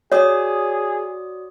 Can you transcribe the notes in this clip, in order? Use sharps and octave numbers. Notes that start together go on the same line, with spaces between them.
F#4 G#4 C#5 D5 D#6